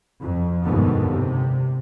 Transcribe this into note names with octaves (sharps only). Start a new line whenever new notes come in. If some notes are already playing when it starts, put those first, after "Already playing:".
F2
G1 D#2 G#2 B2 D3 B3
C3